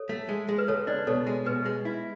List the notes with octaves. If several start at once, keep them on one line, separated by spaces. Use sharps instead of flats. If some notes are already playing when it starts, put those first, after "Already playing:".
Already playing: A4 C#5
A3
G#3
G#3
B4
C#2 A4 C#5
D4 B4 D5
B2 A4 C#5
G#3
B2 B4
G#3
E4